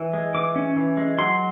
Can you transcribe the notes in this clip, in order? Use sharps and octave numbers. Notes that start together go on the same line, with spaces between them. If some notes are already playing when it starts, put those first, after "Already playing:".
Already playing: E3
G#3
E3 D6
C#4
E3
G#3
F#3 C6